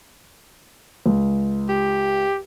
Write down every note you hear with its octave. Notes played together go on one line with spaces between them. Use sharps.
C#2
G4